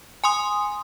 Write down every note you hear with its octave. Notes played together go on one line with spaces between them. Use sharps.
G#5 C6 D#6